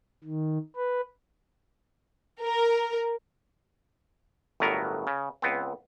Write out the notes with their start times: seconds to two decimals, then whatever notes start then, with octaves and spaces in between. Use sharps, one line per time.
0.24 D#3
0.76 B4
2.42 A#4
4.60 G1 A2 F#3 B3 A#4
5.07 C#3
5.42 C#2 B3 C4